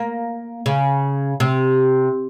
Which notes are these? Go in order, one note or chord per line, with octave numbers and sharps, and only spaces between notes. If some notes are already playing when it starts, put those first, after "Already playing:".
Already playing: A#3
C#3
C3